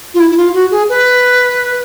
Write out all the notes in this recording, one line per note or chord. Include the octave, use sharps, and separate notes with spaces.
F4
E4
E4
F4
F#4
G#4
B4